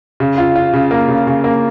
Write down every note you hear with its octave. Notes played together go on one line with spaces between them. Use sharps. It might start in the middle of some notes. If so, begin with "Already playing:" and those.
C#3
F4
F4
C#3
A#3
C#3
C#3
A#3